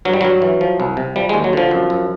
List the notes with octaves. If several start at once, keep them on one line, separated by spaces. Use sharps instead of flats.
G2 F#3
G3
G2 F#3
E3
F3
C2
C3
F3 G3
D#2 G#3
F#3
D3 F3
F#2
F#2